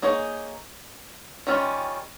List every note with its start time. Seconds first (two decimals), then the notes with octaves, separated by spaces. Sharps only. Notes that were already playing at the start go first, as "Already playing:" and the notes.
0.02 A#3 D#4 G#4 C#5
1.47 D#3 G3 C#4 F4